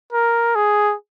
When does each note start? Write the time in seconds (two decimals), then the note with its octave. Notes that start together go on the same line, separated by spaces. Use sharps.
0.12 A#4
0.56 G#4